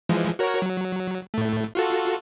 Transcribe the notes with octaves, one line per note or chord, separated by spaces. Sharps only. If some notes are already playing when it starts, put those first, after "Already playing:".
E3 F3 G#3
F#4 A#4 C#5
F#3
A2 A3
F4 F#4 A4